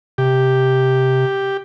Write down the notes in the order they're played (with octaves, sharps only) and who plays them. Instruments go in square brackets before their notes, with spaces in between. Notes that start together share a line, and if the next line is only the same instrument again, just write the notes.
[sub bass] C3 [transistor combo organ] G4